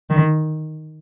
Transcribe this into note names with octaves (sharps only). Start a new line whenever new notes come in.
D#3